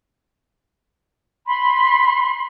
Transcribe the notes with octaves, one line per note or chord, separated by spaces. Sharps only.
B5 C6